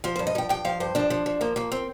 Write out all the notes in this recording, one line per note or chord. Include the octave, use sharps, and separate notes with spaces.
F3 F4
G2 C5
D#5
F3 G5
G2 G5
F3 F5
G2 C5
F3 D4
F3
F3
F3 A#3
F3 A#3
C4